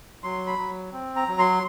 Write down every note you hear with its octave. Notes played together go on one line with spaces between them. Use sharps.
F#3 C6
B5
F#3
C4
A#5
F#3
C6